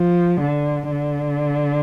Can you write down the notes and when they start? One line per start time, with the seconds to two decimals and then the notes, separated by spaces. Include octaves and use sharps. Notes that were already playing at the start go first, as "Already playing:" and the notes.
Already playing: F3
0.40 D3
0.91 D3